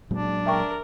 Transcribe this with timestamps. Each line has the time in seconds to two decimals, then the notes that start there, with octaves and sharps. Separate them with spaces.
0.11 A#2 F#3 G#3 D4
0.46 A#4 E5 G5 C#6